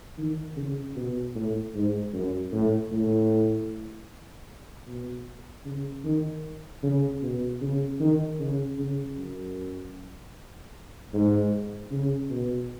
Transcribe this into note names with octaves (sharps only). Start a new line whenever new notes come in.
D#3
C#3
B2
A2
G#2
F#2
A2
A2
B2
C#3
D#3
C#3
B2
C#3
D#3
C#3
C#3
F#2
G#2
C#3
B2